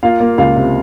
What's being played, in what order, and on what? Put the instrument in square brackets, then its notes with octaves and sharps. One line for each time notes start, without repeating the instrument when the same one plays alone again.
[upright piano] A#3 F4 F5
A#3
C#2 F4 F5
C3